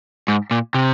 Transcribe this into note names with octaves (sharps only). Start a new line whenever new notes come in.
G#2
A#2
C3